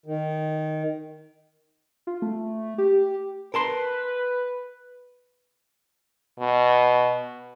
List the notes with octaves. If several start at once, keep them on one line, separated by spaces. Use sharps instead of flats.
D#3
F4
A3
G4
A#4 B4 A5 C6
B2